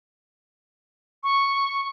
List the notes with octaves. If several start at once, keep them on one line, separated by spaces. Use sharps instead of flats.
C#6